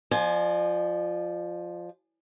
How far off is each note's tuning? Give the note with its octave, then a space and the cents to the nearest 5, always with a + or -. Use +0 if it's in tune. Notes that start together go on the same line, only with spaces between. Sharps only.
F3 +0 D5 +45 G#5 +25